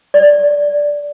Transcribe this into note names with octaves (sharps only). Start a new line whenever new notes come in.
D5